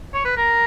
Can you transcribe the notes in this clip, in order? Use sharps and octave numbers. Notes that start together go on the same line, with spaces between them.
C#5
B4
A#4